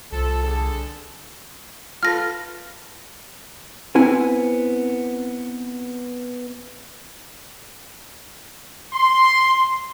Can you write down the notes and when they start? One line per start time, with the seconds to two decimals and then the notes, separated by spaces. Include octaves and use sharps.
0.12 C2 F3 A4
0.43 D3 G#4 A4
2.03 F4 A4 B4 F6 A#6
3.95 B3 C4 E4 G#5
8.93 C6